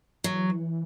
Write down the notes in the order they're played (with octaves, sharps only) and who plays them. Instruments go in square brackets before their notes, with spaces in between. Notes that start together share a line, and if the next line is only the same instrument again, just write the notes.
[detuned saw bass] E3 [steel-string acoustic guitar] F#3